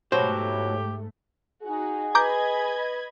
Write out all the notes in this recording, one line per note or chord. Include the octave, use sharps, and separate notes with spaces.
G#2 B2 F#3 A3 E4 G4 C5
D#4 F#4 G#4
B4 D#5 A#5 B5 D6 G6 G#6